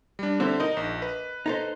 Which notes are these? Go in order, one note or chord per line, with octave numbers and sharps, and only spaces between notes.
G3 D4
D3 C4 E4 C5
D#4 A#4 D#5
A#1
B4
D#4 A4 C5